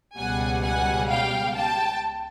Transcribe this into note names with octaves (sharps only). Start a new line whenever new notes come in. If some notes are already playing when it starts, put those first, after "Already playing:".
C#2 B2 G3 F#5 G#5
F#5 G#5
F5 G5
G5 A5